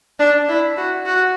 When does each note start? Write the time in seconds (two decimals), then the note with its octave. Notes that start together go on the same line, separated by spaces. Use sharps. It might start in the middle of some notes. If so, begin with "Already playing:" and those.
0.19 D4
0.49 E4
0.77 F#4
1.06 F#4